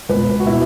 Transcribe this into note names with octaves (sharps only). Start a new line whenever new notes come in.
C#2 B4
B2
F#4
B2 E4